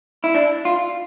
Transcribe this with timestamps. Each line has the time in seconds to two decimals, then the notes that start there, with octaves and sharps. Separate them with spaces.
0.24 E4
0.35 D4
0.65 F4